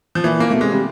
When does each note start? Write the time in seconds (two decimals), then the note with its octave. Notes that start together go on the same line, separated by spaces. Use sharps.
0.15 F3
0.24 A#2 E3
0.40 A#3
0.51 B2 A3
0.61 C3 G#3
0.72 C3 G3